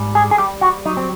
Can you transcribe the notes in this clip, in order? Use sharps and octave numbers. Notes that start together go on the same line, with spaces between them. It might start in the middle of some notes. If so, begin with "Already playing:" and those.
Already playing: G#2 G3
G#4
G#4
G3 G4
F#4
F#3 D#4
C4